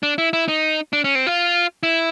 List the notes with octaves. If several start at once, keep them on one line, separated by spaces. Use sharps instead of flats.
D4
E4
E4
D#4
D4
C#4
C4
F4
E4